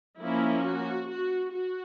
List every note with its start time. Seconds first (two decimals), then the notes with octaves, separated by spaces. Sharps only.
0.20 F3 A#3 C#4 E4
0.65 F#4
1.09 F#4
1.52 F#4